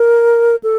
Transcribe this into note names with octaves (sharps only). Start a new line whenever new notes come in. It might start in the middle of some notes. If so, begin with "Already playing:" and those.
Already playing: A#4
A4